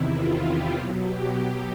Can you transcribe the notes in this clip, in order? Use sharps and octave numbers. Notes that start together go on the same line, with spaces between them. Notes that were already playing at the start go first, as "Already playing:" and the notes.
Already playing: E2 C3 D#3 E4
F4
G4
B2 F#3
G4
G4